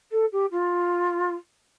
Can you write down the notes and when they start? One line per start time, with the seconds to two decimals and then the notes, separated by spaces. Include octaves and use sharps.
0.12 A4
0.32 G4
0.51 F4